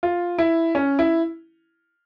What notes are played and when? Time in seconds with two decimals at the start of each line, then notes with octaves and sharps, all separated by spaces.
0.03 F4
0.38 E4
0.75 C#4
0.99 E4